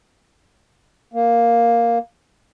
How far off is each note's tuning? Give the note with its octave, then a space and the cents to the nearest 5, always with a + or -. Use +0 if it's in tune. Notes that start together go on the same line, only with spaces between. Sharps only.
A#3 +5